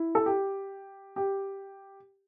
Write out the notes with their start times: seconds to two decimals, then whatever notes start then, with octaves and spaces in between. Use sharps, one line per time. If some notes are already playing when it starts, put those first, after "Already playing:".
Already playing: E4
0.15 A4
0.26 G4
1.16 G4